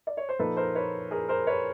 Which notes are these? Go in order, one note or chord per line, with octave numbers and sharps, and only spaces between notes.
D5
C#5
C5
A#2 F3 A#3 D#4 A4 B4
A#4 C5
B4 C#5
G#4 A#4
A#4 C5
B4 C#5